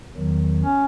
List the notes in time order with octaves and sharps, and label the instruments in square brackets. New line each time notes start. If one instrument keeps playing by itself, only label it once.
[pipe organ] E2 D#3 F#3
[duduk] C#4